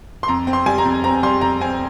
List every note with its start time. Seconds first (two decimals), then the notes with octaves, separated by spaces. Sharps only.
0.23 C6
0.28 F2 A#5
0.47 C4
0.53 C6
0.66 G3 G#5
0.78 A#5
0.85 F2
1.04 C4 A#5
1.23 G3 C6
1.41 F2 A#5
1.61 C4 G#5